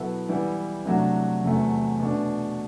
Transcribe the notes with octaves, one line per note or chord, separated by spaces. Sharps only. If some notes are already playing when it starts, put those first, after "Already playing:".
Already playing: B2 F#3 B3 E4 A4
E3 G3 B3 E4
C3 F#3 A3 D4 F#4
E2 C3 F#3 A3
B2 A3 D4